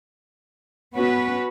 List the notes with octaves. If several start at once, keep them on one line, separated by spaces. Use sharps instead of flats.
B3 C#4 F#4 B4